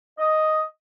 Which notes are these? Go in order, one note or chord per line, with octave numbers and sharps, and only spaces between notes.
D#5